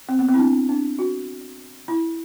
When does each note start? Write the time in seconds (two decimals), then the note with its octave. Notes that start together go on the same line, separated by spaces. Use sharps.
0.09 C4
0.19 B3
0.29 C4
0.34 E4
0.39 D4
0.69 D4
0.99 F#4
1.88 E4